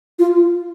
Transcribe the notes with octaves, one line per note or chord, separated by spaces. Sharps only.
F4